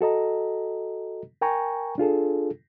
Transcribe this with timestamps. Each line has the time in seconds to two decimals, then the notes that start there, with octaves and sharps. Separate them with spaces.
0.01 F#4 A4 D#5 A#5
1.42 A#4 G5 G#5 A#5 C#6
1.98 D4 F4 G#4 A4